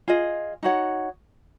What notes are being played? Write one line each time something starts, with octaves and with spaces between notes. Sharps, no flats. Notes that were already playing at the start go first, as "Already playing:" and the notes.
F4 G#4 D#5
D#4 F#4 C#5 F#5